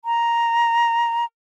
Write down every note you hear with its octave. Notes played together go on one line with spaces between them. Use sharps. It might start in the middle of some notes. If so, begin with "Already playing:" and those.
A#5